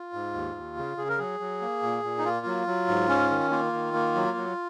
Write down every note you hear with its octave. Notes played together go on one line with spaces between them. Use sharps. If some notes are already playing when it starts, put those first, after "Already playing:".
Already playing: F4
G#2
D#2
D#2
C#3
C#3 G#4
A#4
F#3 G#4
F#3
A#3
A#2
A#2
D#4
A#3 F4
F#3
F#3
G#2
C#4
D#3
A#3 F4
D#3
A#3
F#3
F#3